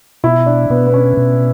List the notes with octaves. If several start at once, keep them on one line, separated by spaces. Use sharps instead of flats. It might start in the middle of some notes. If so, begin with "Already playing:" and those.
B2 E4
D4
B2 B3
B3
C#4
B2